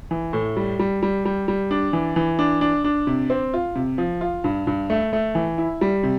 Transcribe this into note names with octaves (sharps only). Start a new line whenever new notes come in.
E3
A2
G3
G3
G3
G3
G3
D4
E3
E3
D4
D4
D4
C3
C4
F4
C3
F3
F4
G2
G2
A3
A3
E3
E4
G3
C3